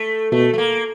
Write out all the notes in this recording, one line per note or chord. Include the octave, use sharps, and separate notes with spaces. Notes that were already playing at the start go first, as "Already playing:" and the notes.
Already playing: A3
B2 A3
A3
A#3